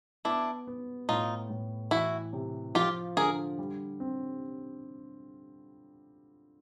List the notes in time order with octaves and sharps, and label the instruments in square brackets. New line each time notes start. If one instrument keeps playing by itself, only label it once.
[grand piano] B3 [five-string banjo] D4 E4
[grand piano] B3
[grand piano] A2 [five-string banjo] D#4 F4
[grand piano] A2
[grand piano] E3 [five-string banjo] E4 F#4
[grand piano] C3
[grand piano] F3 [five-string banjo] F4 G4
[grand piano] D3 [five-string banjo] G#4 A#4
[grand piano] G3
C4